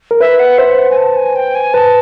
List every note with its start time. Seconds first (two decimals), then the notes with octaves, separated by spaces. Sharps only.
0.11 A#4
0.21 B4 E5
0.39 F#5
0.58 C5 E5
0.78 F#5
0.90 G#5
0.97 A5
1.16 G#5
1.36 G5
1.55 G#5
1.73 B4 A5